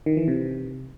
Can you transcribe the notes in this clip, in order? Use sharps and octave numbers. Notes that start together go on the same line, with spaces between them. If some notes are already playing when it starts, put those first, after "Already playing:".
D#3
E3
C3